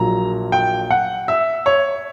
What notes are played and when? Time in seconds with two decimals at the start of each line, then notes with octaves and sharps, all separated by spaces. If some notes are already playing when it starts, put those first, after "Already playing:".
Already playing: A#1 A#2 F#3 A#5
0.52 G5
0.91 F#5
1.28 E5
1.66 C#5